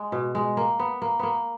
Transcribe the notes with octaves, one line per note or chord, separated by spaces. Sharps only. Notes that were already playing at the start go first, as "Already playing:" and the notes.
Already playing: G#3
B2
G#3
A#3
B3
A#3
A#3 B3